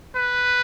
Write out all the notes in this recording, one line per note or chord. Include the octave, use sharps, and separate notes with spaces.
B4